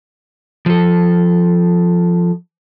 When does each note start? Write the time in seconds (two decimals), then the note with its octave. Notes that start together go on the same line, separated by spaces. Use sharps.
0.66 F3 A4